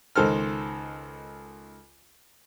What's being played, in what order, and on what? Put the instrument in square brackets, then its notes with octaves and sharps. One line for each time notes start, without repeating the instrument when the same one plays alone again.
[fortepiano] C#2 D#3 A4 C5 F6